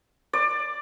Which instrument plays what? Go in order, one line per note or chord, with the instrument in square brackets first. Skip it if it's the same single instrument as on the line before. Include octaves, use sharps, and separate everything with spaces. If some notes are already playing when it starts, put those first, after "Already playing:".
[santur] D5